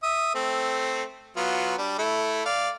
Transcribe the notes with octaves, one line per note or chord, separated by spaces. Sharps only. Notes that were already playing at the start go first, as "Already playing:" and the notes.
E5 D#6
A3 C4
F#3 B3 F4
G3 D4
A3 E4
D5 F5